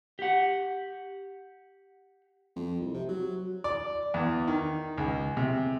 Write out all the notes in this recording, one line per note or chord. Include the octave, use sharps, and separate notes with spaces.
G4 F#5
F2
C2
C3
F#3
D5
E2
D#3
C#2
C3